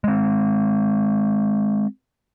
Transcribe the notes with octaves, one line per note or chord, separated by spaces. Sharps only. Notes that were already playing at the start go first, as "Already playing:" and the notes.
G#3 C4